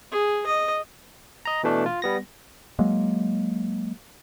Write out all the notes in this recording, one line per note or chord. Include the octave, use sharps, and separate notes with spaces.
G#4
D#5
D#5 A#5
B2 E3 A3 D4
F4
G3 B3 A#6
F#3 G#3 A#3